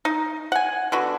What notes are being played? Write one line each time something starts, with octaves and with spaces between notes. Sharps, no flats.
D#4
F#5 G#5
D3 B3 F#4